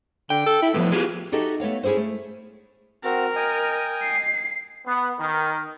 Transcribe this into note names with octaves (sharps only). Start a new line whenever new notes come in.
D3 G5
A4
E4
A2 E3 F3 B3
F4 G4 G#4
D#4 F#4 G4 A4 D#5 E5
A3 B3 C#5 F5
C#4 E4 G#4 A4 C5
A3
C4 F#4 A#4
D#5 G5 G#5
C7
B3
D#3